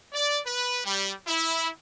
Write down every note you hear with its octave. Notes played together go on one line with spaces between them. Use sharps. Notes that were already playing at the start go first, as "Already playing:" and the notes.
D5
B4
G3
E4